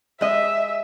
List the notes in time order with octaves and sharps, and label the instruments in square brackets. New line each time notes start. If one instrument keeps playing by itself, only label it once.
[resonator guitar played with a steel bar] G#3 D#5 [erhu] E5